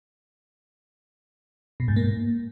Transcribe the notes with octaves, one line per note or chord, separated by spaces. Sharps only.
B2
G#2
A#3